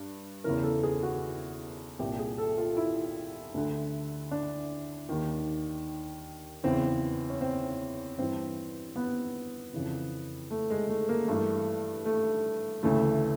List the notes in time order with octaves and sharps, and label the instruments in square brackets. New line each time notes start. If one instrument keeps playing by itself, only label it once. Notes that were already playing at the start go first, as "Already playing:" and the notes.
Already playing: [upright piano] G2
E2 C#3 E3 A#4
A4
G#4
F#4
C2 A#2 G4
G#4
A4
F4
E4
D2 D3
D4
D#2 D#3
E2 C#3 E3 C4
C#4
C4
G2 E3 C4
B3
F2 C#3 E3
A3
G#3
A3
A#3
G2 E3 A3
A3
D2 C#3 E3 A3